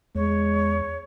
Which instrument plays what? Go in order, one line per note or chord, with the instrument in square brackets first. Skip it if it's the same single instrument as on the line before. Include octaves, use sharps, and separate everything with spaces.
[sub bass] E2 [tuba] G#3 [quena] C#5